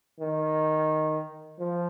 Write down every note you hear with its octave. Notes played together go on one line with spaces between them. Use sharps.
D#3
F3